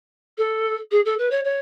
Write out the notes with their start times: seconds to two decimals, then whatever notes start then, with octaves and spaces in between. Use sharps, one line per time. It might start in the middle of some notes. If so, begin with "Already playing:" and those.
0.38 A4
0.91 G#4
1.05 A4
1.19 B4
1.31 C#5
1.44 C#5